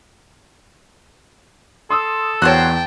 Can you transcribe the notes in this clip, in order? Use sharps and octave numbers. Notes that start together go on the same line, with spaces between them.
A4 C6 D#6 E6
E2 F#4 C5 C#5 G5 A5